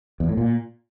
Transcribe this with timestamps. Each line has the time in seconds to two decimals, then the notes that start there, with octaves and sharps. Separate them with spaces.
0.20 E2
0.29 A2
0.37 A#2